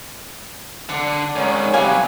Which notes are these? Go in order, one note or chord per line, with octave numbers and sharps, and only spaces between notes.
D3 D4
G#2 D#3 C#4
C3 F#3 G3 F5 G#5